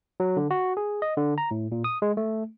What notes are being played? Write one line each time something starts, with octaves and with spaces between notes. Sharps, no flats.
F#3
D3
F#4
G#4
D#5
D3
A#5
A2
A#2
D#6
G#3
A3